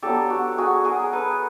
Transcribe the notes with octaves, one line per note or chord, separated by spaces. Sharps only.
F#3 B3 D4 G4 A4
F#4
F#4 G#4
G#4 A#4
A4 B4